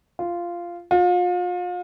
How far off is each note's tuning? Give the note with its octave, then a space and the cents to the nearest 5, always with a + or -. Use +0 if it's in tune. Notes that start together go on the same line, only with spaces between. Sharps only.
F4 -10
F4 +35